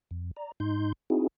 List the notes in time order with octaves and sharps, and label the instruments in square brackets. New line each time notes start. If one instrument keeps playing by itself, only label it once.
[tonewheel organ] F2
D5 A#5
G#2 D#4 C6 G6
C4 D#4 E4 F#4 G#4